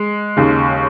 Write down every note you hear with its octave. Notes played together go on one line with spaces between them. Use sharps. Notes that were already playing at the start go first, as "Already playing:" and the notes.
Already playing: G#3
D#2 C#3